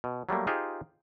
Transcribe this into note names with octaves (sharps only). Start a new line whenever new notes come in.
B2
F#3 G3 A3 A#3
D#4 F4 G4 G#4 C5